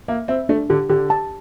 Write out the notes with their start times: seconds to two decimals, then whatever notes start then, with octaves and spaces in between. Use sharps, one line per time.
0.08 A#3 E5
0.28 C4 E5
0.49 A3 D4
0.70 D3 G4
0.89 D3 G4
1.10 A5